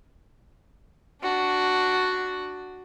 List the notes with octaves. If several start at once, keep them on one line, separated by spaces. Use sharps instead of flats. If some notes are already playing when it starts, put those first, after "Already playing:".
D4 F#4